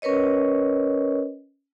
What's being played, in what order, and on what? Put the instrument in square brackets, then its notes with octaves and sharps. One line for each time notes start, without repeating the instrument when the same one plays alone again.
[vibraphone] C#4 A#4 B4 C#5 D#5